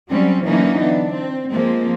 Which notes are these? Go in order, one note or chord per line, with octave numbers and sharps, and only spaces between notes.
F#3 G3 C4 C#4
D3 E3 F#3 A#3 C#4 D#4
B3 D4
C4
F3 G#3 A#3 C4